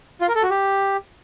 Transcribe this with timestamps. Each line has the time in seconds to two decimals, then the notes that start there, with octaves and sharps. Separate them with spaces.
0.21 F4
0.28 A#4
0.35 A4
0.43 F#4
0.50 G4